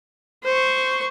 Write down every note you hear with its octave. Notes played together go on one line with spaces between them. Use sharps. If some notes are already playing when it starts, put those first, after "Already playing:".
C5 C#6